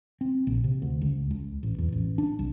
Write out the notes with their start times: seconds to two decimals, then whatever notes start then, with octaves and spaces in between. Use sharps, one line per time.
0.21 C4
0.47 A#1
0.64 C3
0.82 D2
1.02 C#2
1.31 C#2
1.63 A1
1.78 E2
1.92 A1
2.18 D4
2.39 C2